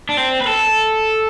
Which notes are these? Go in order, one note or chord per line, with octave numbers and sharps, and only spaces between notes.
D4
C4
B4
A4